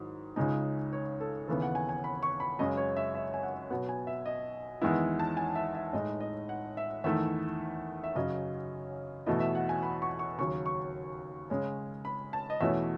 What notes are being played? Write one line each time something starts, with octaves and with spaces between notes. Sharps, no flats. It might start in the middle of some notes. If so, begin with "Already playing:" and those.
Already playing: G#2 D#3 F#3 E4
C#2 C#3 G#3 D#4
C#5
A4
D#2 C#3 E3 B3 A4
F#5
G#5
G#5
B5
C#6
B5
F#2 C#3 G#3 D#5
C#5
E5
E5
G#5
F#5
B2 F#3 B3 F#5
G#5
E5
D#5
E2 D#3 G#3 B3 E4
A5
G#5
E5
E5
A2 G#3 D#4 D#5
D#5
F#5
E5
E2 D#3 A3 E4 E5
E5
F#2 C#3 F#3 C#4 D#5
E2 B2 A3 E4 D#5
E5
F#5
G#5
B5
C#6
C#6
D#2 C#3 F#3 C#6
C#6
C#3 G#3 C#4
B5
A5
D#5
E2 B2 A3 C#4 E4 E5